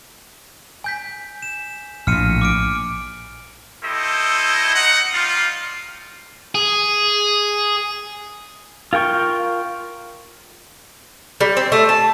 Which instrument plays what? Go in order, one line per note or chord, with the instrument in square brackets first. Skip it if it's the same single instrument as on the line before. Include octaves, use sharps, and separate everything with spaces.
[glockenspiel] G#5 G6 B6
E7
[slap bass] A#1 A2 [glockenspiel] F6 C#7 D#7
[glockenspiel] D6 F6 D7
[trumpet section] E4 G4 A4 C5 D#5
D#4 F#5
G3 D#4 F4
[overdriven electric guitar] G#4
[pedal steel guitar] F4 A#4 G5 C#6
[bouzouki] G3
C4
A3
A5